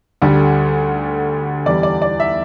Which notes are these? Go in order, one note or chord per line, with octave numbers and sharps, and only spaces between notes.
D2 D3 G3
E2 E3 G3 D5
D5
D5
E5